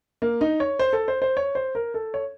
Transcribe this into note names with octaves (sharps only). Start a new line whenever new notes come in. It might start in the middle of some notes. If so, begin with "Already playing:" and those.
A#3
D#4
C#5
C5
A4
C5
C5
C#5
C5
A#4
A4
C#5